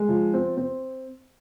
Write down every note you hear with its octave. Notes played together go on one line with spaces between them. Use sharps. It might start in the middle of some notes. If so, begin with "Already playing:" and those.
Already playing: G#3
F3
C4
C4